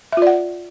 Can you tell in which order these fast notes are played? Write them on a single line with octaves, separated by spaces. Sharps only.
E5 F4 D5 F#5